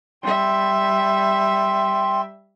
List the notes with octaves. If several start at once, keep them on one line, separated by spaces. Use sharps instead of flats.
G3 E5 G5 C6